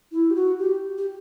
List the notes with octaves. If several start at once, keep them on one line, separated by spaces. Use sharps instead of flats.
E4
G4
F#4
G4
G4